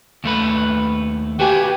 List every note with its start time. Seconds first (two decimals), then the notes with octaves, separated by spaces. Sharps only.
0.24 D#2 A3 B4
1.40 F#4 G4 B4 G#5